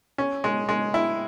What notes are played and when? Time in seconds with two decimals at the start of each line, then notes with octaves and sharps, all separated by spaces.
0.18 C#4
0.44 G#3
0.69 G#3
0.94 E4